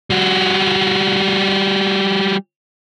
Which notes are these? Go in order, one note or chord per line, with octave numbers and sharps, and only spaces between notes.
G3 F#4